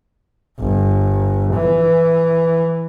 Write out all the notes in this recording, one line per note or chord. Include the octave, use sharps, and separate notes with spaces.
G1
E3